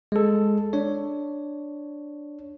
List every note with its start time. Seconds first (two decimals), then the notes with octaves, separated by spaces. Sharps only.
0.12 G#3 A4
0.73 D4 C#5